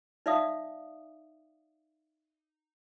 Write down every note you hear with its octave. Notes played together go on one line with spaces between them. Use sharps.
D#4 D5 E5 F5 D#6